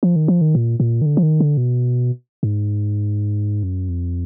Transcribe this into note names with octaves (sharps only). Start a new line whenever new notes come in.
F3
D#3
F3
D#3
A#2
A#2
D#3
D3
F3
D#3
D3
B2
G#2
F#2
F2